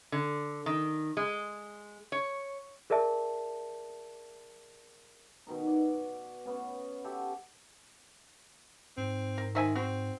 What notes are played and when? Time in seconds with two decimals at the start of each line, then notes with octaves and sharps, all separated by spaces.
0.12 D3
0.66 D#3
1.17 G#3
2.12 C#5
2.90 G#4 A#4 D5 E5 A5
5.47 B2 D#3 D#4
5.67 D5
6.45 B3 C#4
7.04 F#4 G4 A4 E5
8.98 G#2 C4
9.38 A#4
9.55 D#3 C5 E5 G#5
9.75 C4 F#4